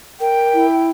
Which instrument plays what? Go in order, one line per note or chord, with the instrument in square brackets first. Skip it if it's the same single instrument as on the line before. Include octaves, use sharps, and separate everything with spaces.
[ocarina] A#4 [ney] G5
[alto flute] E4